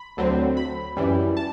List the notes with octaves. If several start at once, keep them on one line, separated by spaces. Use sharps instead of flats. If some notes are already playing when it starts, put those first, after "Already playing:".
Already playing: B5
D2 D3 F#3 C4
B5
F#2 E3 G3
A5